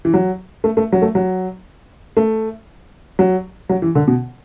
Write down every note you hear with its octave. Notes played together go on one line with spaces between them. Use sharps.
E3
F#3
A3
A3
F#3
A3
F#3
A3
F#3
F#3
E3
D3
B2